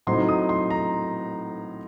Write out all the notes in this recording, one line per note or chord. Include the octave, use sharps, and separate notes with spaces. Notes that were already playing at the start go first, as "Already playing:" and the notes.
A2 F#3 C4 D#4 C6
D#6
C6
A#5